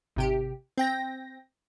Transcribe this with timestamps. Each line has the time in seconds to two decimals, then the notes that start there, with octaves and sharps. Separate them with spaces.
0.16 G#1 C3 G4
0.78 C4 G5 A#6